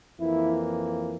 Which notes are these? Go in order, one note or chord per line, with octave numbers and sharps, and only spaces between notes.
F2 E3 A#3 E4